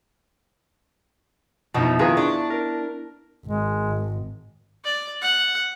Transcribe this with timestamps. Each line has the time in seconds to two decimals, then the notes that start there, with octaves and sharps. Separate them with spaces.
1.74 F2 B2 B3 D#4 E4
1.99 D#3 F4 G#4 B4
2.17 D4 C#6
2.50 A#4
3.46 G#1 G#3
4.85 D5
5.21 F#5